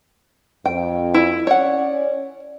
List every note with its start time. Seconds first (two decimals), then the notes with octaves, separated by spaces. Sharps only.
0.66 F2 G5
1.14 E4
1.47 C#4 C#5 D5 F#5